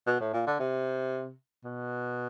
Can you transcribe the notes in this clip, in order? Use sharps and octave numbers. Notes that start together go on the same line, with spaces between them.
B2
A2
A#2
D3
C3
B2